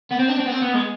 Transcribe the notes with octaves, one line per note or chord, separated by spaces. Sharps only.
B3
C4
D4
C4
B3
C4
B3
G#3